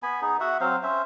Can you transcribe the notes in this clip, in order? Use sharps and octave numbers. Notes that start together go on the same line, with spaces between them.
B3 G#5 B5
B3 D#4 G#4
F#4 E5 F#5
F#3 C4 C5 F5
C#4 C5 E5